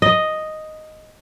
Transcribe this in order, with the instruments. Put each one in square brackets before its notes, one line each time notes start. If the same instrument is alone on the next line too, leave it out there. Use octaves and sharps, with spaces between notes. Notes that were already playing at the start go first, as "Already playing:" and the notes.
[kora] D#5